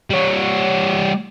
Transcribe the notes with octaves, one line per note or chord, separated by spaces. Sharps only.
G3 C#5